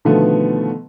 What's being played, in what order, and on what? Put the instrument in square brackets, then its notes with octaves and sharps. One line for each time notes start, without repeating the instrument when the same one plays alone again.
[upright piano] B2 D3 D#3 F3 A3 B3